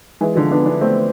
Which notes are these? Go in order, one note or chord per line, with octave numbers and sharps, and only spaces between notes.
E3 G#3
D3 F3
B3 D4
B3 D4
A3 C4